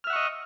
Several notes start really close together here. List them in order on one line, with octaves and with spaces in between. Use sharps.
F6 E5 F#5 C#6 D#5